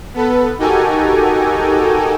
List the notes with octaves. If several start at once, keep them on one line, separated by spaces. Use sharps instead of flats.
B3 A4 B4
D#4 F#4 G4 A4 A#4 G#5